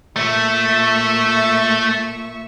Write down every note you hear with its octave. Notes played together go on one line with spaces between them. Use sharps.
A#2 A3 E5 C#6